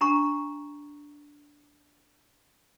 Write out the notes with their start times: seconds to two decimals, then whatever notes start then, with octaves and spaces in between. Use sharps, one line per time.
0.01 D4 F#5 A#5 C#6